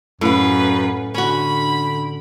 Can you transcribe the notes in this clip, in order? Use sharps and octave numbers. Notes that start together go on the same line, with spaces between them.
F#2 A2 B4 F5
D3 C#4 F#4 B5